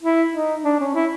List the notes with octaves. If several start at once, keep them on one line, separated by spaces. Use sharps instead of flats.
E4
D#4
D4
C#4
E4